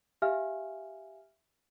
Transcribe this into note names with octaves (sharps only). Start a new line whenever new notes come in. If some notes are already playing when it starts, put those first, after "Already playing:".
G4 E5 F5 G#5 F6